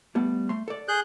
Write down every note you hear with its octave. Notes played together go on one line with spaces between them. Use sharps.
G3 A3 B3
A3 C6
A4 D5
G#4 F#6 G6